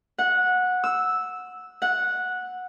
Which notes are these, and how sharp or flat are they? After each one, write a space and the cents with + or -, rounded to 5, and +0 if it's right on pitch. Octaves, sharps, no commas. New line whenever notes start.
F#5 -15
E6 -5
F#5 -10